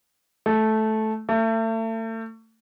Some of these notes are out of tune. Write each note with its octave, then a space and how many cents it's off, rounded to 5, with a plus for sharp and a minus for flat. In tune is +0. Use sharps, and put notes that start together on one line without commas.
A3 -10
A3 +35